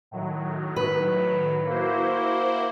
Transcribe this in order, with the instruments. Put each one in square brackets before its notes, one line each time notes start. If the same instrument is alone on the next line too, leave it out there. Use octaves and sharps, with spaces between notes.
[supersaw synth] A2 D#3 F#3
[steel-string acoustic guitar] B4
[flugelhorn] A#3 [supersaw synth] E4 F#4 C5